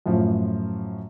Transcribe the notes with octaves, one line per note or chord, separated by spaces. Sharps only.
F#2 A2 F3